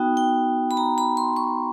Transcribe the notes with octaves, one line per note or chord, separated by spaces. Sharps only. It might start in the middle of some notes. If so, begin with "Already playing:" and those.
Already playing: B3 D#4 F#4 G5
G5
B5
A#5
B5
C6
C#6